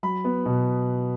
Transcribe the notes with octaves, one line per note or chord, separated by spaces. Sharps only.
F#3 B5
B3
B2